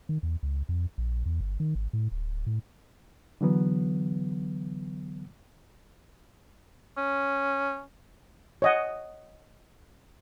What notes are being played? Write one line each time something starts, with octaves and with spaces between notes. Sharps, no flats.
D#3
E2
C#2
F2
A#1
E2
G1
D#3
G#1
A2
D1
A2
D3 E3 F#3 B3
C#4
C#5 D#5 F#5